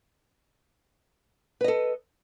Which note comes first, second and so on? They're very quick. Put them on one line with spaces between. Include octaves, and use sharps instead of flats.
B4 D#5 A4